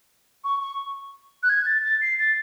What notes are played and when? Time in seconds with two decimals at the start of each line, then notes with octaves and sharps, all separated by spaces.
0.44 C#6
0.61 C#6
1.43 F#6
1.49 G#6
1.66 A6
1.84 A6
2.01 C7
2.19 A6